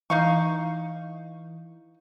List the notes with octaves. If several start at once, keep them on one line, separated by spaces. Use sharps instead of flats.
E3 D#4 F5 C#6